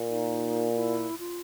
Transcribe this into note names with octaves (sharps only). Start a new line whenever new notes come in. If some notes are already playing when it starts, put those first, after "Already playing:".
Already playing: A#2
D#4
E4
F4